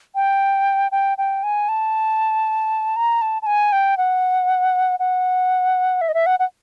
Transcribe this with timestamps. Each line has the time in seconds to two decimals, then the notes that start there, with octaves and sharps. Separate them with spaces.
0.15 G5
0.92 G5
1.18 G5
1.43 G#5
1.69 A5
2.96 A#5
3.22 A5
3.42 A5
3.46 G#5
3.72 G5
3.98 F#5
4.99 F#5
6.01 E5
6.09 D#5
6.14 E5
6.26 F#5
6.39 F#5